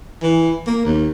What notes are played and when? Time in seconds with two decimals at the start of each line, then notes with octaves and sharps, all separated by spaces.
0.22 E3
0.67 A#3
0.85 D#2